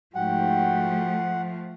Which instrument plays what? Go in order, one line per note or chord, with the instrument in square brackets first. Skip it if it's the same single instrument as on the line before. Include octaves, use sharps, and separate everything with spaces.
[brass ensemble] G#2 F#4 G5 [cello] F3 A3 [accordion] F#5